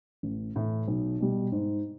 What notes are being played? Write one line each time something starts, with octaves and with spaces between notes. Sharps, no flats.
A1
A2 E3
B1
B2 G3
G#2